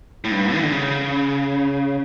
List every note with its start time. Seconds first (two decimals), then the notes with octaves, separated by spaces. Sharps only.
0.24 A2
0.31 G2
0.55 E3
0.63 D3
0.72 C#3